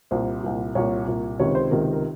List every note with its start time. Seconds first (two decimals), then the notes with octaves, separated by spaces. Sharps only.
0.11 C2 A#2 C5
0.43 C2 A#2
0.75 C2 A#2 C#5
1.08 C2 A#2
1.40 C#2 C3 D#3 C#5
1.55 C5
1.71 C#2 C3 D#3 A#4
1.93 A#4